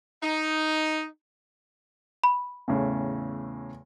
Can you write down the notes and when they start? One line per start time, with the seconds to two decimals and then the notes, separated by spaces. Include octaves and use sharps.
0.22 D#4
2.24 B5
2.68 E2 A2 C#3